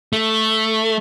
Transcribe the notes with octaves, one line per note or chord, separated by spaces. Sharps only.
A3